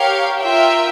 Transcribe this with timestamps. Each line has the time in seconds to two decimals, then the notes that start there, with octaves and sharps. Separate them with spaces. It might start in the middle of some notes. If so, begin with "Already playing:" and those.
Already playing: G4 A#4 C#5 F5
0.39 F4 A#4 E5 G5